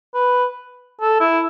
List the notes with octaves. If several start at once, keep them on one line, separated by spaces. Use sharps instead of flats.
B4
A4
E4